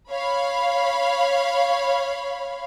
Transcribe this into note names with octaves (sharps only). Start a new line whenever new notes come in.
C#5 F5 B5